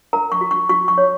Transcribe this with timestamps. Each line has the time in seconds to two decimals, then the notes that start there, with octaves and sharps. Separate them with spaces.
0.13 A#4 A#5
0.32 C#6
0.41 F#4
0.51 C#6
0.69 F#4 C#6
0.88 C#6
0.98 C#5